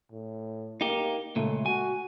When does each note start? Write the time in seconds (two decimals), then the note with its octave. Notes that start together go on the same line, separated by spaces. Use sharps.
0.11 A2
0.81 A#3 D#4 G4
1.36 C#2 A#2 A3
1.66 F#4 G#5